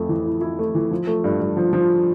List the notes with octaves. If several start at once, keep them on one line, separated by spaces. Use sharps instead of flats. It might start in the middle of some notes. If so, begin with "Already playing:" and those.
Already playing: F2 A3
E3
E4
E4
A3
E3
F3
A3
G2
G2
F3
F3